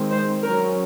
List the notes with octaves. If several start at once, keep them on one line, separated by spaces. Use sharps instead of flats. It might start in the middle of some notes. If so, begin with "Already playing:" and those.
Already playing: D#3 G#3 C4
C5
F#3 C#4 A#4